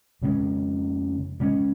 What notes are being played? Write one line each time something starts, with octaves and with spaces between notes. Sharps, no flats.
F2 C#3 G#3 C#4
C#3 G#3 C#4